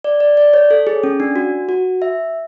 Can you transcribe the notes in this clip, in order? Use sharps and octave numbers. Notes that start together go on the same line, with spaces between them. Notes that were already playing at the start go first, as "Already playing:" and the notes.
D5
D5
D5
C#5
A4
G#4
C#4
D4
F#4
F#4
E5